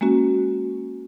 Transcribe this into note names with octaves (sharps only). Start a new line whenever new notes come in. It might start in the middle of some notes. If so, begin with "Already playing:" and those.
G#3 A#3 C#4 F#4